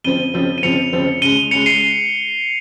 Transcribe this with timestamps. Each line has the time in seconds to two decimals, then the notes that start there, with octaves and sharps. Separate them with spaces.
0.04 F2 C#3 F3 C4 D#7 G7
0.34 F2 C#3 F3 C4
0.58 D#7
0.63 F2 C#3 F3 C4 C#7 F7
0.93 F2 C#3 F3 C4
1.22 C#2 C#3 G#3 D#7 G7
1.51 C#2 C#3 G#3 C#7 F7
1.66 C7 D#7